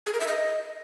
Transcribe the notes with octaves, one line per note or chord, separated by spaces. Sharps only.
G#4
A#4
E5
D#5